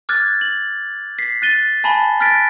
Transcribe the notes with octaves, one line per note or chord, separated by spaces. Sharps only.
D6 F6 F#6 G#6 A6
F#7
B6 C7
F#6 A6 D#7 G7
G#5 A5 B5 G7
F6 F#6 A6 B6 D7